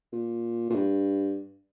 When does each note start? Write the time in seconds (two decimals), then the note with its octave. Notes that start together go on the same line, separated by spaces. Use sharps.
0.13 A#2
0.70 A#2
0.75 G2